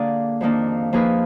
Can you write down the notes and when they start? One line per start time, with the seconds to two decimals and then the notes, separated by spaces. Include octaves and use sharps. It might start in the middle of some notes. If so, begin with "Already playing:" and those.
Already playing: D3 A#3 D4 G#4 D5
0.41 F2 D#3 A#3 D4
0.93 F3 A#3 D#4 G#4 B4